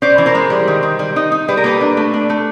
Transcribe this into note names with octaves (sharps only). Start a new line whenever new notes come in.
C#4 C5 D5
E3
A#4 C5
G#3
G3
D#3
D#3
G3
D#4
D#4
G3 B4
A#4
A#3 A4 B4
D4
A3
D4
A3